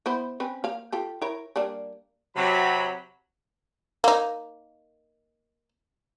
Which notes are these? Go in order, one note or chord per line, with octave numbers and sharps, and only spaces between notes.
B3 E4 C5
C4 C#4 B4
A#3 F5
F4 G4 A4
E4 A#4 C#5
G3 A#3 D4
C3 F#3 B5
A#3 D#4